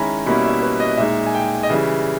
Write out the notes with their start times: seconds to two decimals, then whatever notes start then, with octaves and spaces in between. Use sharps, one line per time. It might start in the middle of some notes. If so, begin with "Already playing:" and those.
Already playing: D#3 G#3 C#4 E4 G#5 A#5 B5
0.26 B2 G3 A#3 C#4 E4 B5
0.44 E5
0.62 B4
0.80 D#5
0.98 A#2 G#3 D#4 E5
1.27 G#5
1.35 G5
1.63 D#5
1.69 C#3 E3 G3 E5